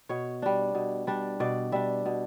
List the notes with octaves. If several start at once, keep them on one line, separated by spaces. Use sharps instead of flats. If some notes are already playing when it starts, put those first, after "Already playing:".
B2 C#5
G3 D4
B2
G3 D4
B2 D5
G3 D4 E5
B2